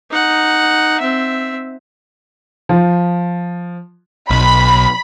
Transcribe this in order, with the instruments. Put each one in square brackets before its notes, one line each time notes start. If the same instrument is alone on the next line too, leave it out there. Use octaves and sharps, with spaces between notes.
[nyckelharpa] D#4 F#5
C4 E5
[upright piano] F3
[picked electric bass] B1 [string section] B5